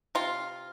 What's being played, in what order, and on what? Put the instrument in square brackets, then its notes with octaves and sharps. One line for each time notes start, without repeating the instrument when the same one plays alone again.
[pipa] C3 F4